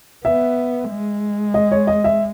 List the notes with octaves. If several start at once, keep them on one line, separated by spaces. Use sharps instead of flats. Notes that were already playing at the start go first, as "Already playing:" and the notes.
B3 E5
G#3
D#5
C#5
D#5
E5